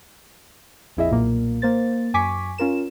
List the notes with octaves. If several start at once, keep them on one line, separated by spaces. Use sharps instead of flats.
A#1 F2 E4 G#4 D#5 E5
B1 A#2 A#3
A#3 C5 A6
F#2 G#5 C#6 D6 B6
C#4 F4 A#4 E7